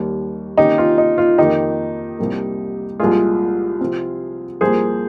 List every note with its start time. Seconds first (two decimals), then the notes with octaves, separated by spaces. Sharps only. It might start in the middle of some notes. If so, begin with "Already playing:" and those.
Already playing: D#2 D#3 G3
0.57 C3 D#3 A#3 C#4 D#4 G4
0.78 F4
0.98 D#4
1.18 F4
1.38 F2 D#3 A#3 D#4 G4
2.19 C2 C3 G3 A#3
2.99 C2 A#2 F3 G#3 F4 G#4
3.81 C3 F3 C4
4.61 C2 A#2 F3 A#3 G#4 C5